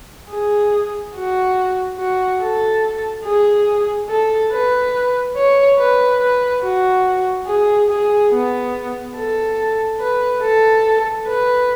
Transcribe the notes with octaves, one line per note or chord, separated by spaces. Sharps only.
G#4
F#4
F#4
A4
G#4
A4
B4
C#5
B4
B4
F#4
G#4
G#4
B3
A4
B4
A4
B4